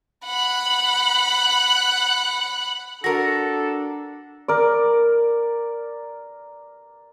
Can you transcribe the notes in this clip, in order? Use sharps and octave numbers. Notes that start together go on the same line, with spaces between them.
F#5 B5
D4 F#4 A4 A#4 A#6
A#4 D5